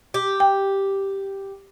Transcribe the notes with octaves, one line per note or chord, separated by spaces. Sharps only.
G4
G5